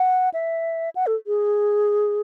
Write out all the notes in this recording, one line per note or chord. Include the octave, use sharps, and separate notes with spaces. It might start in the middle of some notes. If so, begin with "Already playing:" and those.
Already playing: F#5
E5
F#5
A4
G#4